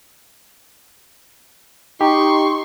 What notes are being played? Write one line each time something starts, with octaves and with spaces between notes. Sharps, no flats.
D#4 G4 C6 C#6